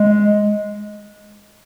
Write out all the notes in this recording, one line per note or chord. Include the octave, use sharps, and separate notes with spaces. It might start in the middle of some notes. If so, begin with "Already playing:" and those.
Already playing: G#3